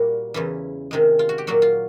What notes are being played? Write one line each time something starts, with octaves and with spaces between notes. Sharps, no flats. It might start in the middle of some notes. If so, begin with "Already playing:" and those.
Already playing: A#2 G3 A#3 F#4
E2 C#3 E3
C3 D#3 G#3
F4
F#4
G4
A#2 F#3 A#3 F#4
F4